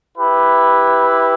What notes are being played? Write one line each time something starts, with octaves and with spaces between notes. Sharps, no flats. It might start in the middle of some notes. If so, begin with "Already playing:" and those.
E4 G4 B4